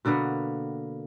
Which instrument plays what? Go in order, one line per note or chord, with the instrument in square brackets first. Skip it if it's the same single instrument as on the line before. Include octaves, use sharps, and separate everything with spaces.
[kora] B2 D3 A#3 B3